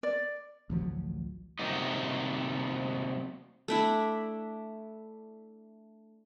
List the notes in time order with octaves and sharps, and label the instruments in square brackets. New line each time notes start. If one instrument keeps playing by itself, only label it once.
[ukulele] D5
[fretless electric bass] A1 D2 F3 F#3
[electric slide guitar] C3 F#3 G3 A#3 D#4
[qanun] A3 D4 E4